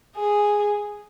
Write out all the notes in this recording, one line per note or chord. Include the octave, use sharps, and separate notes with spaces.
G#4